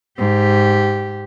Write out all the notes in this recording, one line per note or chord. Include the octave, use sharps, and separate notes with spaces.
G#2 G4